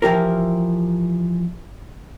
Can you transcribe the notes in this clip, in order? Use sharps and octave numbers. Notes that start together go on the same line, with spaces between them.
E3 F3 G4 A#4